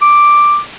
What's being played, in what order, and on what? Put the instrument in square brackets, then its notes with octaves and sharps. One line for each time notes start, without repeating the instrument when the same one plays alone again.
[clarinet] D6